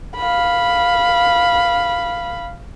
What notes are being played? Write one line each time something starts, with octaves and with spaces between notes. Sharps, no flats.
F5 B5